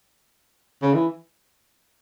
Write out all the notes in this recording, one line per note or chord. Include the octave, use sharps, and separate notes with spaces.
C#3
E3